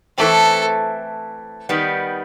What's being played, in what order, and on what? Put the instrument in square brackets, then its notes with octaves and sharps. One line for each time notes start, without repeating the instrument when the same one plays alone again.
[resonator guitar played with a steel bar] E3 A3 C4 [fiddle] A4
[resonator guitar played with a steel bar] D#3 G3 B3